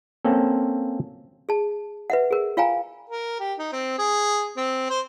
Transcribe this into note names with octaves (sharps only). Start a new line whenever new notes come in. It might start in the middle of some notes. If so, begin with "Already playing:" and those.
A#3 C4 C#4 A4
G#4 A5
B4 E5 F#5
G#4 A#4
F4 F5 G5 G#5 A#5
A#4
G4
D#4
C4
G#4
C4
C5